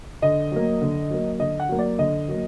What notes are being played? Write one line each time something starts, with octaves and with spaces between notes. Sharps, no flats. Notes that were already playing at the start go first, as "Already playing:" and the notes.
D3 D#5
F#3 A#3
D3
F#3 A#3
D3 D#5
F#5
F#3 A#3
D5
D3 D#5
F#3 A#3